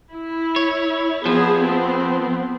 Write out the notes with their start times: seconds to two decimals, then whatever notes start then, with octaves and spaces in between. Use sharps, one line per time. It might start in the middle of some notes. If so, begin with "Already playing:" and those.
0.14 E4
0.56 C#5
1.26 F2 F3 B3 G#4
1.61 B3 C4